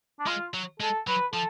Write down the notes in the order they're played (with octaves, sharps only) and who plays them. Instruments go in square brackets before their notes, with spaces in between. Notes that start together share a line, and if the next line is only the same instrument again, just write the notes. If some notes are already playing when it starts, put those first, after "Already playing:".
[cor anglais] D4
[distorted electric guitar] G#3 [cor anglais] F4
[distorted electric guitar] F#3
[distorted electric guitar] G#3 [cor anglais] A4
[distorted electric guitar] F#3 [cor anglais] B4
[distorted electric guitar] F3 [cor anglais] A4